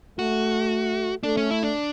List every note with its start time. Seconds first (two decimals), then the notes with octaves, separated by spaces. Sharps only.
0.19 A3 F#4
1.23 A3 D4
1.37 C#4
1.51 E4
1.63 D4